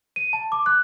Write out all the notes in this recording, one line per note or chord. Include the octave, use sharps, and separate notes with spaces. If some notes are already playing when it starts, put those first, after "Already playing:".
D#7
A5
D6
F#6